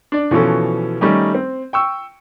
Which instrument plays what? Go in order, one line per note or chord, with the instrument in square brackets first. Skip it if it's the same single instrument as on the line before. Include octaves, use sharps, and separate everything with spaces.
[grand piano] D4 D5
B2 E3 F3 C#4 A4
D#3 G3 A3 C#4 D#4 G4
C4
G5 C#6 E6